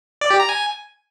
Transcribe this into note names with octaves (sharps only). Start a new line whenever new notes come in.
D5
G4
A#5
G#5